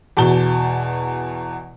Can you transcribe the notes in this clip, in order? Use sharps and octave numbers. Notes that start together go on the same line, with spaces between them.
E2 B2 A5 G7